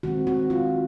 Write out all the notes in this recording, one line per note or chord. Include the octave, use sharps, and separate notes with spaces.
D#3 G#3 C4 F#4
F#4
F4